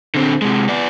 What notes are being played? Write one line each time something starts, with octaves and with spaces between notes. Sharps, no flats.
D3 C4
C3 G#3
B3 D5